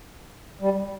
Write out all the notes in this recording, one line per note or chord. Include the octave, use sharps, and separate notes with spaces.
G3